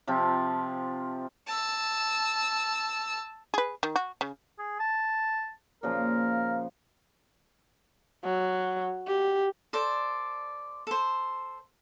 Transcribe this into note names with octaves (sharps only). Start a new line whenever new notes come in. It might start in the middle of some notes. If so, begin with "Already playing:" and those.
C3 F3 C4 F4
A5 E6
G#4 B4
D#3
F#4
C#3
G#4
A5
A#2 C#3 F3 A#4
F#3
G4
A4 C5 D5
A4 C5